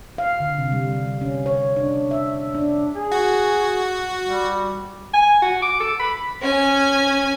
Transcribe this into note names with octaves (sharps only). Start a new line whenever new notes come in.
F5
D3
C3
G3
C#4
C#5
D4
E5
D4
G#4
F#4
G3
G#5
F#4
D6
A4
B5
C#4 G#5